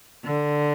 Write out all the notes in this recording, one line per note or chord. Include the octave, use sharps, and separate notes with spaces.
D3